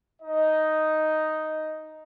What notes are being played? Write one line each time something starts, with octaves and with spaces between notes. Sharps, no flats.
D#4 D#5